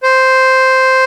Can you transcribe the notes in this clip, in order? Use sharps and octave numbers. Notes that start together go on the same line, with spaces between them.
C5